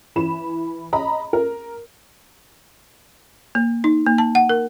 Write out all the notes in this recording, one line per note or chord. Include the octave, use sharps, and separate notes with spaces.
E3 B5 E7
D#5 A#5 B5
A#4
A#3
D#4
A#3
A5
F#5
A#4